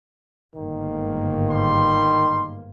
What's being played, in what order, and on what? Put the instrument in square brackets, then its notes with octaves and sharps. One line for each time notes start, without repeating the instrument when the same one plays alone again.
[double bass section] G1 G#2 A#3 [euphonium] D#3
[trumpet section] G3 C6